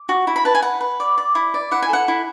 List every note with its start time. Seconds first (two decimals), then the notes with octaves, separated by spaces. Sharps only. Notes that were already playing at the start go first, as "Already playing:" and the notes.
Already playing: D6
0.09 F#4
0.27 E4
0.36 B5
0.45 B4 A5
0.55 G#5
0.62 B4 F#5
0.81 B4
1.00 D5
1.18 D5
1.35 E4
1.54 D5
1.71 E4 F#5
1.82 G#5
1.89 A4 F#5
2.08 E4